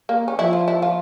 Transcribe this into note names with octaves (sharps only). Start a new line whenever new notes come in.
A#3
C#4
F3 E4
F4
E4
F4